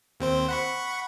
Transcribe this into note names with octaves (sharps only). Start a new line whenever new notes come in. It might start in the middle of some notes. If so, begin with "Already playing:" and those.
D#2 C4 C5
F#5 B5 C#6